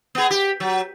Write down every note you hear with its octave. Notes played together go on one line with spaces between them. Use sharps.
B3 G#4
G4
F#3